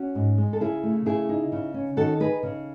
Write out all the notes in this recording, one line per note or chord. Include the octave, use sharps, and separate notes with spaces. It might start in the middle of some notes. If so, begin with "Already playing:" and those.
Already playing: C#4 F#4
G#2
G#3
A4
C#3 E4 G#4
A3
C#3 E4 G#4
D#4
C#3
C#4
D#3 F#4 A4
D#4 G#4 B4
C#3